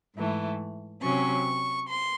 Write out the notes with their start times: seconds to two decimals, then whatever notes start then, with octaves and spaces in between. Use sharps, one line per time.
0.15 G#2 E3 A3
1.02 C3 F#3 C#4 C#6
1.87 C6